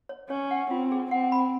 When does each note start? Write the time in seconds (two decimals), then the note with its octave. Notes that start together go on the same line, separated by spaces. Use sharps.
0.09 C#5
0.30 C#4 C#5
0.51 F#5
0.71 C4 F4
0.92 G#4
1.11 C4 F#5
1.32 B5